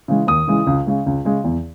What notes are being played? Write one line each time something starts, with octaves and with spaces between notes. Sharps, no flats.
C#3 E3 G#3
D#2 D#6
C#3 E3 G#3
C#2
C#3 G#3
C#2
C#3 G#3
E2